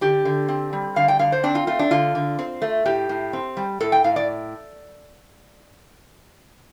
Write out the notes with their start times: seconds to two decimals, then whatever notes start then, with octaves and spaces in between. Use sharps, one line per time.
0.01 D3 G4
0.25 D3
0.48 C4
0.73 G3
0.96 D3 F5
1.08 G5
1.19 D3 F5
1.32 C5
1.43 C4 D4
1.55 F4
1.67 A3 F4
1.79 D4
1.91 D3 F4
2.15 D3
2.39 C4
2.62 A3
2.85 A2 G4
3.09 A2
3.33 C4
3.57 G3
3.80 A2 A4
3.92 G5
4.04 A2 F5
4.16 D5